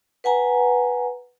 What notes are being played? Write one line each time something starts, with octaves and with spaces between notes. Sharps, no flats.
B4 F#5 G#5 A#5